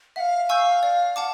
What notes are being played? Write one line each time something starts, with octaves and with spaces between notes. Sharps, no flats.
E5 F5 F#5
G#5 C#6 E6 G6
D5
F#5 A5 D6